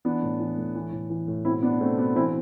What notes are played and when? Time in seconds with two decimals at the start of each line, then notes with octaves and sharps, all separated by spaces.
0.05 E3 B3 D4
0.23 A2
0.40 E3
0.58 A2
0.75 E3
0.92 A2
1.10 E3
1.28 A2
1.45 B2 C4 E4
1.62 B2 B3 D4
1.80 B2 A3 C4
1.98 B2 B3 D4
2.15 E3 C4 E4